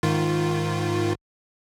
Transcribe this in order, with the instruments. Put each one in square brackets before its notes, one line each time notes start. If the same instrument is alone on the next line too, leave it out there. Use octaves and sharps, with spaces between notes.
[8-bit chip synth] G#2 D#3 F4